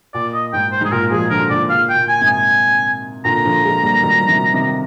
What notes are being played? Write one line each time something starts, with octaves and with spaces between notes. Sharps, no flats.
A#2 D5
D#5
G#2 G5
C5
G#2 G#4
A#2 A#4
F3 G#3 G#4
D3 F3 A#4
A#2 D3 D5
A#2 F5
G5
A#2
G#5
G#2 C3
G#5
A#2 D3 A#5
D3 F3
F3 G#3
G3 A#3
D#3 G3
F3
C3 D#3
C3 D#3